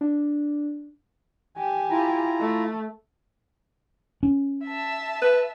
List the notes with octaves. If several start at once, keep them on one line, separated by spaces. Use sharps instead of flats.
D4
G4 G#5
E4 F4 A#5
A3
C#4
E5 A5
B4